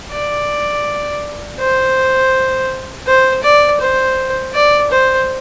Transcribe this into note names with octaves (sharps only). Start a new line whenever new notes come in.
D5
C5
C5
D5
C5
D5
C5